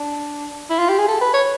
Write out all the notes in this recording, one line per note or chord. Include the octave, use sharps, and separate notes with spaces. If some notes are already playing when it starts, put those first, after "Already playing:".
Already playing: D4
E4
F4
G4
G#4
A4
B4
C#5